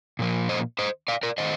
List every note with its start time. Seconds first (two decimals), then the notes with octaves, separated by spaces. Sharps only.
0.19 A#2 F3 A#3
0.49 C5 D#5
0.79 C5 D#5
1.08 D5 F5
1.23 A#4 D5
1.38 D#3 A3 C5 D#5